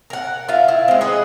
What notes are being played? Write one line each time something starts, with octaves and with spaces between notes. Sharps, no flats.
A#4 F#5
F4 E5 F5
E4
G#3 C4
G#4 B4 D#5 F#5